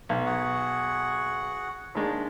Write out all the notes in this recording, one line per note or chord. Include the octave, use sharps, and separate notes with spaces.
B1
F#4 G#4 F#5
D#2 G#3 D4